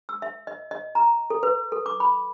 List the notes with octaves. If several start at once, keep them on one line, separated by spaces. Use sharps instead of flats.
E6
E5
D#5
D#5
A#5
A4
B4
A4
D6
B5